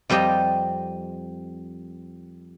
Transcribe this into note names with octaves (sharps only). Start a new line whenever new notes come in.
F2 G3 C4 G4 D#5 A5